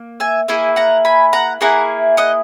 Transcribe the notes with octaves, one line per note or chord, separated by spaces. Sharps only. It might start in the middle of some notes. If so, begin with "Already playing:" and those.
Already playing: A#3
E5 G#5
A#3 E4 G#4 E5 G#5
F#5 A#5
G#5 B5
F#5 A#5
A#3 E4 G#4 F#5 A#5
D#5 F#5